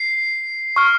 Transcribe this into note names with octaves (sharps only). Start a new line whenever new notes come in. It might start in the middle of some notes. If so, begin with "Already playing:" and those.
Already playing: C7
C#6 F6